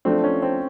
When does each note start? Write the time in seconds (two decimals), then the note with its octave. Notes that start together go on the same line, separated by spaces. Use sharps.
0.05 F3 A3 C4 D4
0.24 C#4
0.42 C4